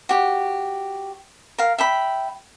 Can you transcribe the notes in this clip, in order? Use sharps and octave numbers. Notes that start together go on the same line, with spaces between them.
F#4 G4
A#4 F5
E5 G5 B5